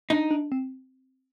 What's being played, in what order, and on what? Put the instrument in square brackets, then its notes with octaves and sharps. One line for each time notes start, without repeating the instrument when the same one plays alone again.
[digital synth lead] D4 [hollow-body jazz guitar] D#4
[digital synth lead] D4
C4